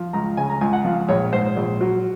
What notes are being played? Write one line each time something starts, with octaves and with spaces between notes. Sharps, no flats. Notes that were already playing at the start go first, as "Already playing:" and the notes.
Already playing: F3
C#2 A#5
C#3 G#5
A#5
C#2 G#5
F#5
F3 F5
A#1 C#5
G#2 C5
A#1
F#3